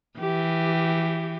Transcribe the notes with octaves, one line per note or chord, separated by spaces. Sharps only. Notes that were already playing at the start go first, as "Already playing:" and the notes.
E3 G4